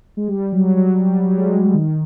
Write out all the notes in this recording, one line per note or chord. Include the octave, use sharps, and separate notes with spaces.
G#3
G3
F#3
F#3
G3
F#3
G3
G#3
D#3